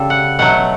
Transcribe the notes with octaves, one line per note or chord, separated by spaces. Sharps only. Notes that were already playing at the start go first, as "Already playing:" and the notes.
Already playing: C#3 G3 A4
F#5
B2 F#3 A3 F#5